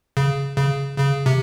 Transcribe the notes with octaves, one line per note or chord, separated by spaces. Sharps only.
C#3
C#3
C#3
C3